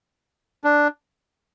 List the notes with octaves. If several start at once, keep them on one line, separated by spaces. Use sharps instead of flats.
D4